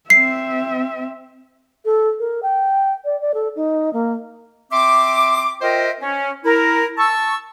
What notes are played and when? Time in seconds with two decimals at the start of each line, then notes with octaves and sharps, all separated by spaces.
0.10 C4 E5 C7
1.85 A4
2.19 A#4
2.43 G5
3.05 D5
3.21 D5
3.34 A4
3.56 D#4
3.93 A#3
4.72 C4 E5 C6 D6
5.62 F4 A#4 C5 D#5 E5 G5
6.01 C#4
6.45 E4 A#4
6.98 A5 C#6 E6